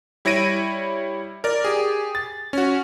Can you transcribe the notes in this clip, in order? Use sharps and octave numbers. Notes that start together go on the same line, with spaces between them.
G3 E4 C#5 A#6 D7 D#7
A#4 D5
G4 G#4
A6
C#4 F#4